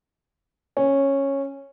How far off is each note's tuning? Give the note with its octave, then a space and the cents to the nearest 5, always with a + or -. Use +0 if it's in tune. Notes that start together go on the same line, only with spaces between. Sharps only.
C#4 -10